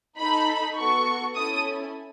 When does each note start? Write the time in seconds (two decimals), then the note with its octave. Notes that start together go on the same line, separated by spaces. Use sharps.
0.18 D#4 A4 B5
0.76 B3 F#4 A4 C#6
1.36 C#4 E4 A4 D#6